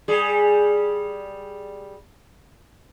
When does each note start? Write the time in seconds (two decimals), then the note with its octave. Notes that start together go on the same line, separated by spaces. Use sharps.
0.08 G3 G#4